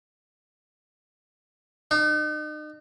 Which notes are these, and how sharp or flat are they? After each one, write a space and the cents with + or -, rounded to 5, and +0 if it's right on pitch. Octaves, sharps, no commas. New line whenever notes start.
D#4 -40